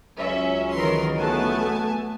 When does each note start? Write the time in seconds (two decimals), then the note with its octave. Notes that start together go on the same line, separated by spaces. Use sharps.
0.18 C#2 F#3 C#4 E5
0.75 D#3 E3 A#4 B4 C6
1.18 A3 B3 G#5 A5